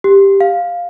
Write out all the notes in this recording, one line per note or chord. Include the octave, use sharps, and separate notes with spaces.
G4
F5